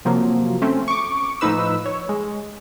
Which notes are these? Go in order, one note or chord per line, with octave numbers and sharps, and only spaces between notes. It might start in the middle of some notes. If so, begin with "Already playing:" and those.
C3 F3 F#3 A#3
A3 C4 C#4
C#6 D6
A2 F3 D#4 B4 E6
C#5
G#3